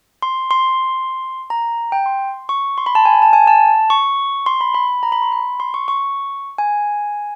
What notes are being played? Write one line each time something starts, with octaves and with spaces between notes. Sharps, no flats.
C6
C6
A#5
G5
C6
C#6
C6
B5
A5
G#5
A5
G#5
A5
C#6
C6
B5
B5
A#5
B5
C6
B5
C6
C#6
C#6
G#5